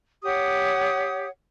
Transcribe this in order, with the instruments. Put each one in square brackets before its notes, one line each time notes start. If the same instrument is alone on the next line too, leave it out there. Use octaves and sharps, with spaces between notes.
[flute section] G4 C#5 F#5 D#6